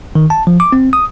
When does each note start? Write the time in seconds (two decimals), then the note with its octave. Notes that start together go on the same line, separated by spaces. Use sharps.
0.15 D#3
0.30 A5
0.47 F3
0.60 D6
0.72 C4
0.93 D#6